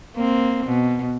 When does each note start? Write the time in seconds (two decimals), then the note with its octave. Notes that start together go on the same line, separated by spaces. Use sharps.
0.16 A#3 C4
0.66 B2